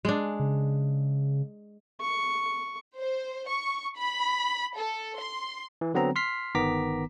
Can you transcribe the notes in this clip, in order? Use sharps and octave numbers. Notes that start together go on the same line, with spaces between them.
G#3 D4
C#3
C#6
C5
C#6
B5
A4
C6
E3
D3 F#3 B3 C4 A#5
C6 F6 B6 C7
G1 D#3 B3 A#5 D6 B6